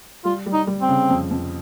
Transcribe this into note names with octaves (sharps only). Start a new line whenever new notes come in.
G3 F4
G3
D#4
G3
C4
C#3
F2
F2